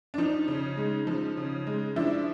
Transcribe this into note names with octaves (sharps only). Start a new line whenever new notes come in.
D4
F3 D#4
C#3
G#3
F3
C#3
G#3
F3 D4 E4